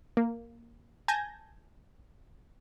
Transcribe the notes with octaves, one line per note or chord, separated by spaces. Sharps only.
A#3
G#5 A5 G6 G#6 A#6